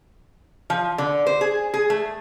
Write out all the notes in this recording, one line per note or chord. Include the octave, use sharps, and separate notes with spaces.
F3
D3
C5
G#4
G#4
A3